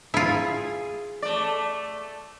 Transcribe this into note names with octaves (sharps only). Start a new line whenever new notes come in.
E4 F4 G#4
A3 D5